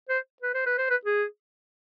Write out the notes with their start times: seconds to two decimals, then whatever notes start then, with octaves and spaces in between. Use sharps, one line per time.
0.09 C5
0.42 B4
0.54 C5
0.66 B4
0.78 C5
0.91 B4
1.05 G#4